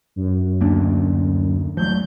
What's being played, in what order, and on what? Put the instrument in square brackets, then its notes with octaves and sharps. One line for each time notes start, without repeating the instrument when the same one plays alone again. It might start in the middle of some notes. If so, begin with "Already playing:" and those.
[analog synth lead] F#2
[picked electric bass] D2 A#3 D4
[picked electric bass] F3 F#3 A3 [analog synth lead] G6